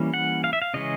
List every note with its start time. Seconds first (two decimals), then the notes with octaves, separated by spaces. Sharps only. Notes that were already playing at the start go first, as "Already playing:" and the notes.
Already playing: E3 G3 A#3 C#4
0.14 F#5
0.44 F5
0.53 E5
0.62 F5
0.74 C#3 E3 G#3 C#4 D#5